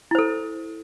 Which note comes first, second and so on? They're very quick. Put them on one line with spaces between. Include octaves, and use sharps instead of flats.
E4 C5 A4